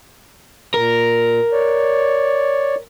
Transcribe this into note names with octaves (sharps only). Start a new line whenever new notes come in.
A#2 A#4
C#5 D5